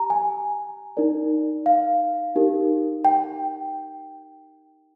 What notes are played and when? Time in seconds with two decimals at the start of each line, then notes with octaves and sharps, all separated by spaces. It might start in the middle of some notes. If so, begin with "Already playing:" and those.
Already playing: G4 A#5
0.10 G#5
0.97 D#4 A#4 D5
1.66 F5
2.36 D#4 G4 A#4
3.05 G5